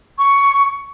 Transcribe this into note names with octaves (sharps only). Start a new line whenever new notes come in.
C#6